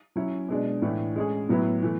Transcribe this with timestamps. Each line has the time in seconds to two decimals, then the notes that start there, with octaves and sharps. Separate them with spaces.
0.16 F#3 C#4 E4
0.49 B2 G#3 D4 G#4
0.82 A2 E3 A3 D4
1.16 G#3 C#4 G#4
1.49 A2 F#3 B3 E4
1.82 E3 A3